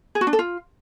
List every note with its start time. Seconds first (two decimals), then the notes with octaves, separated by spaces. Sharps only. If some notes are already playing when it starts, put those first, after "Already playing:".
0.15 G#4
0.21 F#4
0.27 D4
0.33 A4
0.39 F4